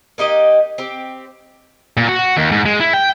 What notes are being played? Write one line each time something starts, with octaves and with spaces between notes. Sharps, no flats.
A#3 D#4 G4 D#5
C4 G4
A#2
F#4
D#2
G#2
G#3
E4
G5